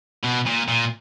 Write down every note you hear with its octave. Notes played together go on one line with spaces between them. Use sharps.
B2
A#2
A#2